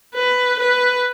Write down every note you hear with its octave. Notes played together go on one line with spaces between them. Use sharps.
B4
B4